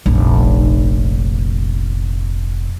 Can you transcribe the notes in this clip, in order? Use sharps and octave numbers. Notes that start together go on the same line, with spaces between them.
F1 A#1